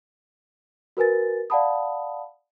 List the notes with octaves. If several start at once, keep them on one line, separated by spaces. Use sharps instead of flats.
F#4 A#4 B4 G#5 A6
D5 F5 F#5 A5 B5 D#6